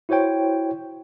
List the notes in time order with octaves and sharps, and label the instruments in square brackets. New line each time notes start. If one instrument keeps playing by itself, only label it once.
[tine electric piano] E4 F#4 C5 C#5 G5